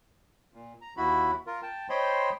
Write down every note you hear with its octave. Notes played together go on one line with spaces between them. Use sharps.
A#2
A#5
D#2 E4 F#4 B5
F4 A#4
G5 A5
C5 C#5 D#5 G5 B5 C6